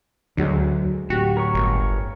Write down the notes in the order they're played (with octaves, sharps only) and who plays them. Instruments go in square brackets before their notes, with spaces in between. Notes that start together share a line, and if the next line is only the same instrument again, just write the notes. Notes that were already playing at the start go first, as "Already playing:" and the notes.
[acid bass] D2 [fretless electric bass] D3 F#3 G#3
[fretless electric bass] D1 [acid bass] F#4 [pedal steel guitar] G4
[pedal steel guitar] A#4 C#5 C#6
[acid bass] G1